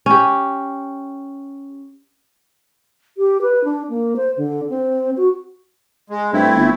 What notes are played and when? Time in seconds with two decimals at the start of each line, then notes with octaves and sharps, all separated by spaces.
0.06 C#4 G4
3.17 G4
3.42 B4
3.64 D4
3.89 A#3
4.16 C5
4.37 D3
4.69 C4
5.17 F#4
6.10 G#3
6.33 G2 A3 C4 E4
6.55 G1